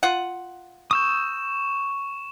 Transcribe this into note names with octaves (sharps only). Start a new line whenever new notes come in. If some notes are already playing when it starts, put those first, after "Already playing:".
F4 F#5
C#6 D#6 E6 G6 E7